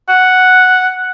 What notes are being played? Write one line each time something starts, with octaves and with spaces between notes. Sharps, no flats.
F#5